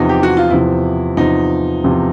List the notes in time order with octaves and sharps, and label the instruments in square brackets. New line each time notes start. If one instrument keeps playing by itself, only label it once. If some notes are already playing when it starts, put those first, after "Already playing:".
Already playing: [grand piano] E2 C3 F3 [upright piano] D#4
[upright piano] G4
F#4
F4
[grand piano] E2 C3 F3 [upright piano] E4
[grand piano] E2 C3 F3 [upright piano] D#4
[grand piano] E2 C3 F3